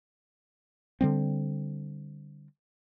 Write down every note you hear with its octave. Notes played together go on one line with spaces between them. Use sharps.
D3 G3 C4